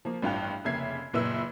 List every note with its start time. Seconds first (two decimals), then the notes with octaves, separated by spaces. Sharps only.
0.05 F3 A#3
0.22 A1 G2 F4 G5 F#6 F7
0.64 F1 C#3 A#3 E5 G#6 C7
1.13 F#1 A#2 B4 E5 E6